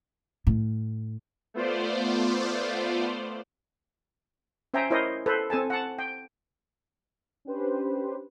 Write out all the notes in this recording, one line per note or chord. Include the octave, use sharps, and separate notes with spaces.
A2
A3 B3 F4 C5 D5
C#4 C5 E5 G5 G#5 A#5
E4 A#4 C5 C#5 D#5
A4 B4 C5
C4 A4 G#5 A5
F#5 A5
G5
C#4 D4 G4 B4 C5